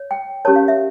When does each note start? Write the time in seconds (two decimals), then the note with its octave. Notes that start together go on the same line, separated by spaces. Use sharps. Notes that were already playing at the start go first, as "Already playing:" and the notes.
Already playing: C#5
0.11 G5
0.45 C#4 G4 A#4 C#5 A5
0.56 F5
0.68 E5